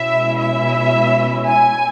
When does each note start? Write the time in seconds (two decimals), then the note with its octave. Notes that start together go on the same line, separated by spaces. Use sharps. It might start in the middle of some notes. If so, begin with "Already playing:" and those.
Already playing: B2 G#3 C#4 E4 E5
0.39 E5
1.46 G#5